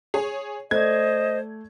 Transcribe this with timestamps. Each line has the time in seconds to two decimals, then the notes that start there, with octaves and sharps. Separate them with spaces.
0.14 G#4 C#5
0.71 A3 C5 D5 D#5 G#6